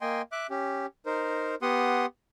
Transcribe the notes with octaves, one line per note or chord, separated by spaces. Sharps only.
A#3 D#5 G5 G#5 C6
E5 D6 F#6
C#4 G4
D#4 A#4 C5
B3 G4 F#5 C6 D#6